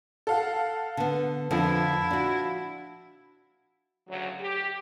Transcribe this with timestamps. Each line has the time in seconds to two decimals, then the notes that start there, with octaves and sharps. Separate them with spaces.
0.27 A4 F5 F#5
0.97 D3 B3
1.51 F2 D3 F3 E4
2.11 D4 F#4
4.08 D2 C#3 F#3
4.40 G4